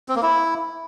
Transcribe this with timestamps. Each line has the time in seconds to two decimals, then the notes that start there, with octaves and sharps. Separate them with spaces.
0.09 C4
0.16 A#3
0.23 E4